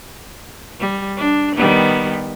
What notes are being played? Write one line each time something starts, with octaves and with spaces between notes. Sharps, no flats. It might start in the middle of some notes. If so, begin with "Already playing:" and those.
G3
D4
D#3 G3 B3